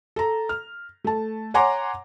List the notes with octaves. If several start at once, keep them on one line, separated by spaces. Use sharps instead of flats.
A4 A#5
F6
A3 A5
C#5 F#5 G#5 A#5 C6 D6